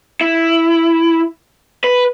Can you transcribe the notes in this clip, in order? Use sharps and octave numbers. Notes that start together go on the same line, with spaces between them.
E4
B4